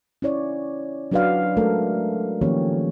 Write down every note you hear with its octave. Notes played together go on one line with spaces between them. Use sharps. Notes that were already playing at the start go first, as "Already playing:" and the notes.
C#4 E4 C#5 D5
F#3 D4 F#4 B4 D5 F5
G#3 A3 C#4 A4 A#4
D#3 F3 A#3 C#4 G4 C#5